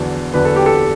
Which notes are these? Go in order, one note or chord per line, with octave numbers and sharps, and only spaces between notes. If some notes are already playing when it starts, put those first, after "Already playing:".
Already playing: E2 D3 F#3
E2 D3 F#3 B4
A4
G4
A4